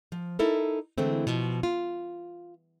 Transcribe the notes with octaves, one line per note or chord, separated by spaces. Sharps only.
F3
D#4 E4 A4 A#4
D3 E3 G#3 A3 C4
B2 F3
F4